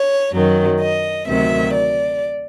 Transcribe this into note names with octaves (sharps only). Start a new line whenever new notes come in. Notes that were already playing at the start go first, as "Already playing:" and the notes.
Already playing: C#5
F#2 D#3 F#3
D#5
D2 C3 D#3 F#3 E5
D5